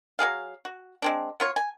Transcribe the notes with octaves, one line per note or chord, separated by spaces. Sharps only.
F#3 D4 G#4 F5
F#4
G#3 C4 D4
B3 F4 C#5
G#5